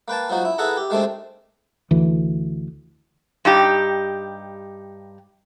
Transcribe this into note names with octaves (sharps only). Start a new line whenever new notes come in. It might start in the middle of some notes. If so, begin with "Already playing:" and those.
A#3 B4 G5 A5
F3 F#3 D#4 F#4
E4
E4 G#4 A4 B4 F#5 A#5
G4
D#3 G#3 A3 C4 D4
D2 E3
G2 D#4 G4